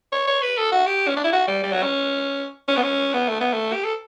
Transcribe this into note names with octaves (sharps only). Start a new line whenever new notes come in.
C#5
C#5
B4
A4
F#4
G4
C#4
D4
E4
F#4
G3
G3
F#3
C#4
C#4
B3
C#4
B3
A3
B3
A3
G4
A4